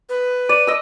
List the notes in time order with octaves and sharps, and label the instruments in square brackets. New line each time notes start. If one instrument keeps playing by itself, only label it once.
[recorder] B4
[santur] D5 [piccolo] D#7
[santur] D#5 E6